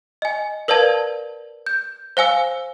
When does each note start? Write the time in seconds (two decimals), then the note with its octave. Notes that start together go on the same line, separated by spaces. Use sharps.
0.22 D#5 G#5
0.68 A#4 B4 D5 F5 A5 G#6
1.67 G6
2.17 C5 F5 G#5 E6